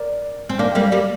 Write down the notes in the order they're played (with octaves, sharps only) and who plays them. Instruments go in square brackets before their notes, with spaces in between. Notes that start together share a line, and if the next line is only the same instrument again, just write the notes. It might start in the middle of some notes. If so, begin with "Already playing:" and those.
Already playing: [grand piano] A#4 D5
[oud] C4
[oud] A#3 D4 [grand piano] F5
[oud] G3 A#3 [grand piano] G5
[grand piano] D5 F5
[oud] G3 A#3